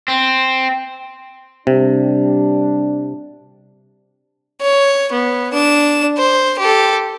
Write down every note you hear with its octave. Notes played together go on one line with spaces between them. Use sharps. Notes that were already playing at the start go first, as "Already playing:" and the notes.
C4
C3 G3 D4
C#5
B3
D4 E7
C5
G4 A4